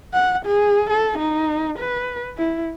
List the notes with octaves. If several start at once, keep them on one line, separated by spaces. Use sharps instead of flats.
F#5
G#4
A4
D#4
B4
E4